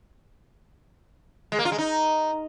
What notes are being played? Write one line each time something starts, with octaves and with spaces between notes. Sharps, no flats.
G#3
A#3
F4
G#3
D#4